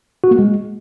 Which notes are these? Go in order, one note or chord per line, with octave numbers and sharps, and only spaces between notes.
F#4
A#3
G#3